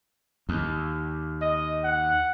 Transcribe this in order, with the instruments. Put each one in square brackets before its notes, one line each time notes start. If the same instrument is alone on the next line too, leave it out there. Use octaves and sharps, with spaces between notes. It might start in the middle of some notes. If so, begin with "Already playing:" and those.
[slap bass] D#2
[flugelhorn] D#5
F#5